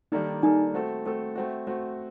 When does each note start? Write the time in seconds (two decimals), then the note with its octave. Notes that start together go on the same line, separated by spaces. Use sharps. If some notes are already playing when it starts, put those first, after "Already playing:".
0.12 D#3 G3 A#3 D4 D#4 A4
0.42 D#3 G3 A#3 D4 D#4 A4
0.74 A3 C4 F#4 A4
1.06 A3 C4 F#4 A4
1.36 A3 C4 F#4
1.67 A3 C4 F#4